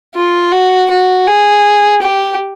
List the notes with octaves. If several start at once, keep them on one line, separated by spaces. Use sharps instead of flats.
F4
F#4
F#4
G#4
G4